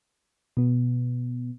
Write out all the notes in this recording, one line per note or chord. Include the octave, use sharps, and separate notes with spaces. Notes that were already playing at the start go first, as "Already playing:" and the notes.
B2 B3